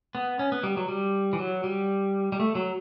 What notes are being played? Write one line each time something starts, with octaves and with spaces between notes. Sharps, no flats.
B3
C#4
B3
G3
F#3
G3
E3
F#3
G3
G3
A3
F#3